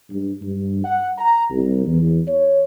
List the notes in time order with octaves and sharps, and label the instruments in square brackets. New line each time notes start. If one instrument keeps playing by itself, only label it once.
[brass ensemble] G2
G2
F#5
A#5
C2
E2
C#5